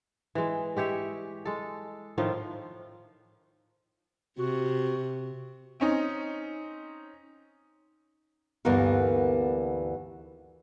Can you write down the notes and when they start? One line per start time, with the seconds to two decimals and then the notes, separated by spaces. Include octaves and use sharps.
0.35 E3 G#3
0.76 G#3 G4 C#5 E5
1.45 G#3 A4
2.18 A2 D#3 F3 F4
4.38 C3 F#4
5.80 C4 C#4 D#4
8.65 D2 G2 E3 A#3 B3 A#4